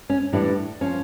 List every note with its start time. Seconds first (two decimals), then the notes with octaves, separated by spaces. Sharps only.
0.10 C#4
0.33 A2 E3 G3 D4
0.81 F3 C#4